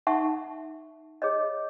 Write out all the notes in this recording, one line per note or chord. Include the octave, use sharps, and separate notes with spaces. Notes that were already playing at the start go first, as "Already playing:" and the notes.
D#4 E5 F#5 A5 C#6
G#4 C#5 D#5